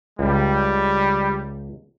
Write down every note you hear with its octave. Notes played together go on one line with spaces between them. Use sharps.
C#2 G3